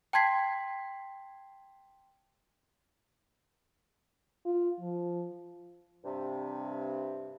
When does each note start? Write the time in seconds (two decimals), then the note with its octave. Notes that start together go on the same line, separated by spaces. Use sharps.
0.13 G5 A5 C6 G#6 B6 C7
4.45 F4
4.81 F3
6.04 G2 C3